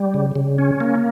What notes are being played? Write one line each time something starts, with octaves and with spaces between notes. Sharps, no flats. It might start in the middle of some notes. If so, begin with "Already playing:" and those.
Already playing: G3
C#3
C#3
C#4
A#3